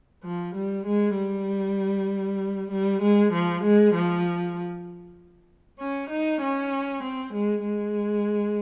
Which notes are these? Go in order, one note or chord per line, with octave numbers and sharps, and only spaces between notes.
F3
G3
G#3
G3
G3
G#3
F3
G#3
F3
C#4
D#4
C#4
C4
G#3
G#3